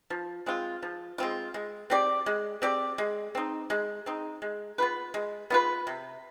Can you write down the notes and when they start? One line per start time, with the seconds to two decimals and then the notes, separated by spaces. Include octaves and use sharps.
0.10 F3
0.46 G#3 C4 F4
0.83 F3
1.18 G#3 C4 F4
1.54 G#3
1.90 C4 G4 D5
2.26 G#3
2.62 C4 G4 D5
2.98 G#3
3.35 C4 D#4
3.70 G#3
4.06 C4 D#4
4.42 G#3
4.78 B3 F4 B4
5.14 G#3
5.50 B3 F4 B4
5.87 C3